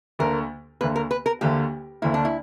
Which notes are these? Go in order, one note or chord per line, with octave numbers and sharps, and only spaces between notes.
D2 D3 A#3 A#4
D2 D3 A#3 B4
A#4
B4
A#4
D2 D3 A#3 G4
D2 D3 A#3 E4
D4
E4